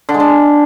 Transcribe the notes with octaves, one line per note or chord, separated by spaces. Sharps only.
D3
G#3
D3